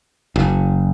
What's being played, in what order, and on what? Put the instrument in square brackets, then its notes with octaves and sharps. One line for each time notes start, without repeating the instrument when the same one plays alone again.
[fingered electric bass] F#1